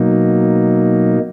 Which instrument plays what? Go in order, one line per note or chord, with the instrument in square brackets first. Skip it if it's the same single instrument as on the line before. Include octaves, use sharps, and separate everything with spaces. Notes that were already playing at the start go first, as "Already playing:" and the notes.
Already playing: [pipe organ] B2 F#3 A#3 D#4